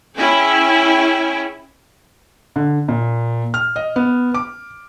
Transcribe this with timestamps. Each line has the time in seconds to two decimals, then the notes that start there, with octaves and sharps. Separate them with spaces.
0.16 C#4 E4 G#4 G5 G#5
2.56 D3
2.88 A#2
3.54 F6
3.76 D#5
3.96 B3
4.34 D6